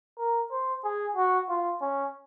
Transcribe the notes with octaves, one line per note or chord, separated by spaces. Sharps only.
A#4
C5
G#4
F#4
F4
C#4